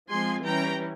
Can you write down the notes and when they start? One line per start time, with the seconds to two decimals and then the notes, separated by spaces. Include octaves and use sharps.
0.08 F3 G#3 C4 G#5 C6
0.44 E3 G3 C#4 G5 A#5